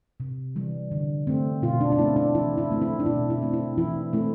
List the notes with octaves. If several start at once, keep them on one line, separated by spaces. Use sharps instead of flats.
C3
E3 G3
D3
A3 C4
B2 F4
D4
D4
A3 C4 E4
D4
E3 E4
E4
A3 C4
E4
D4
B2 E4
E4
A3 C4
E4
E3 E4
A3 C4 E4